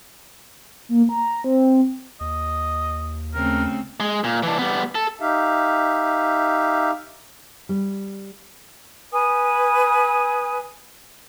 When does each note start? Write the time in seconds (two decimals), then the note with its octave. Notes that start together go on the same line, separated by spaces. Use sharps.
0.89 A#3
1.09 A#5
1.44 C4
2.20 D#2 D#5
3.34 C#3 A3 C4 A#4
4.00 G#3
4.24 A#2
4.43 E3 D4
4.59 G3 B3
4.95 A4
5.21 D#4 G4 E5 F5
7.69 G3
9.12 B4 G#5 D#6